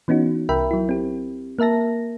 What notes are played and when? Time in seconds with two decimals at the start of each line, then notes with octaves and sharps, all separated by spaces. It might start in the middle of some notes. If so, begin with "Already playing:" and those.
0.08 E3 B3 C#4 D#4 F#4
0.49 C2 A#4 E5 G5 B5
0.71 F#3 E4
0.89 C4 G4
1.59 A#3 A#4 E5 A5 A#6